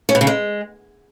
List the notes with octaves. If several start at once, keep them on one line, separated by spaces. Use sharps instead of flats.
C#4
B2
C#3
G#3